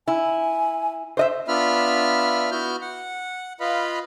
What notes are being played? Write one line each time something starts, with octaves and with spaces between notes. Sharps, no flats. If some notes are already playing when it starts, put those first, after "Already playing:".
E4 G#5
C5 D#5 E5
B3 D4 F4 E5 B5 F6
B3 E4 F#4 F6 G6
F#5
F4 B4 D#5 F5 B5